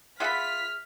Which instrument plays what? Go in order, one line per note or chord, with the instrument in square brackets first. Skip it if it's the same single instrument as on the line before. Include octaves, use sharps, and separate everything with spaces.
[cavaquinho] F4 B5 [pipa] G#4 E5 F#5 [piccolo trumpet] F6 [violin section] B6